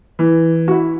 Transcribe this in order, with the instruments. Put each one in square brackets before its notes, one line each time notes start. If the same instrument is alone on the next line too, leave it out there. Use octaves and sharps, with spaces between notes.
[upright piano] E3
F#4
E4